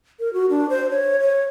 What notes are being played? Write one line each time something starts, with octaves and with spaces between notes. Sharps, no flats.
A#4
F#4
D4
C5
C#5
C#5